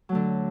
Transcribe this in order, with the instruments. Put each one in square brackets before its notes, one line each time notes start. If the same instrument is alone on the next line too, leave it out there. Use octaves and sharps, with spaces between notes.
[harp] F#3
A3
D3